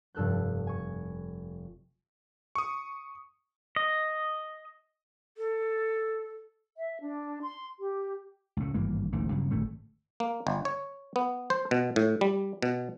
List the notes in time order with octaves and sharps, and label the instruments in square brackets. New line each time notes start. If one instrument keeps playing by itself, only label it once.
[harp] F1 G2 A4 F#6 G6
G#5 C#6
[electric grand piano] C#6 D#6
[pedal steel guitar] D#5
[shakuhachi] A4
[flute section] E5
D4
C6
G4
[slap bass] C#2 A2
G#1 G2 E3 A#3
D1 A1 A#2 D#3
G2 C#3 F#3
D1 G#1 A2 A3
[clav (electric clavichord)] A#3
G1
C#5
B3
C5
B2
A2
G3
B2